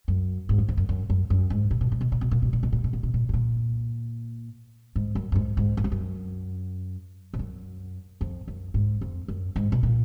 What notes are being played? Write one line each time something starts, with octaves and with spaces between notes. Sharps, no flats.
F#2
G#2
F#2
F2
F#2
F#2
F#2
F#2
G#2
A#2
B2
A#2
B2
A#2
B2
A#2
B2
A#2
B2
A#2
B2
A#2
B2
A#2
G#2
A#2
G#2
F#2
F#2
G#2
G#2
F#2
F2
F#2
G#2
F#2
F2
F#2
G#2
F2
F#2
G#2
B2
A#2